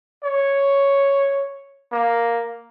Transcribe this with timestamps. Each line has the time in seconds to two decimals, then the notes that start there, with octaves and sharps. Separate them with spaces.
0.24 C#5
1.92 A#3